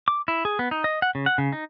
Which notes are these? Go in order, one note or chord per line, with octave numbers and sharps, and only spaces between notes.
D6
E4
G#4
B3
D#4
D#5
F#5
C#3
F#5
C#3
D#4